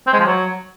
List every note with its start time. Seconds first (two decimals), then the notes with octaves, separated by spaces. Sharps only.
0.07 C4
0.13 G#3
0.19 F3
0.26 F#3